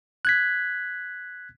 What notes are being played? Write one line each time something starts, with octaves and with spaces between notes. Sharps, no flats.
F#6 G#6 B6